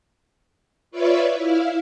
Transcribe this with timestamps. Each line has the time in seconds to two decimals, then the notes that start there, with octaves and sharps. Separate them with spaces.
0.91 F4 B4 C#5 D5 E5
1.34 E4 F5